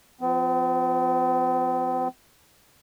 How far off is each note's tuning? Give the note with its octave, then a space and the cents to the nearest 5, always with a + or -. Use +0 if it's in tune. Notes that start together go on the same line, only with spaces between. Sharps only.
F3 +0 C4 -45